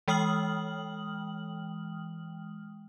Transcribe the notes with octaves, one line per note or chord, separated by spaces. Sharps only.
E3 G#3 G5 D#6 F6 F#7